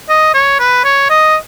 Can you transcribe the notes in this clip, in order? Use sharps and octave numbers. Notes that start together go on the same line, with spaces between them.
D#5
C#5
B4
C#5
D#5